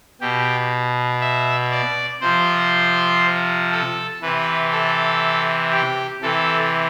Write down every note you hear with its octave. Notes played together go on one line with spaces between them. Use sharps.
B2 G4
E5
D5
C3 F3 C5
A4
C3 E3 B4
A4
G4
C3 E3 A4